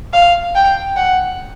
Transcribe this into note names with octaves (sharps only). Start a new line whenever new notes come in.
F5
G5
F#5